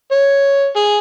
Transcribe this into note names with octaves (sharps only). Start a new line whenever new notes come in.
C#5
G#4